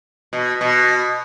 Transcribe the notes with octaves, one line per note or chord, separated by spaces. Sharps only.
B2
B2